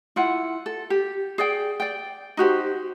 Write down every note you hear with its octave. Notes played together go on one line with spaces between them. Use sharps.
E4 F4 F#5
A4
G4
G#4 D5 G5
D5 G5
D#4 F#4 G4 C5